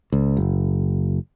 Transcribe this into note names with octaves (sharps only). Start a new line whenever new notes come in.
C#2
F#1